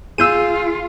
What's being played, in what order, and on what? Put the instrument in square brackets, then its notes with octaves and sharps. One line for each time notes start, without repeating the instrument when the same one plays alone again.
[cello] F4 [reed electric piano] G#4 [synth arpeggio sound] E6 G6 D#7